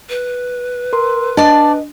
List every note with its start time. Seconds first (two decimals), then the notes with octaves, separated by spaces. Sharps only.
0.10 B4
0.93 A#4 C6
1.37 D4 D5 D#5 A5